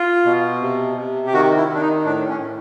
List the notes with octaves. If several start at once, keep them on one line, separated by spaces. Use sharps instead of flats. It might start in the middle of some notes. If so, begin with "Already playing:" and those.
Already playing: F4
B2
C3
C3
G4
D#3 F#4
E4
D#3
D4
D#4
A2 D4
C#4
A2